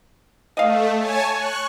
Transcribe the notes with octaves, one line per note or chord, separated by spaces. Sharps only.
A3 D#5 F5
C#5 G#5 A5
C#6 F#6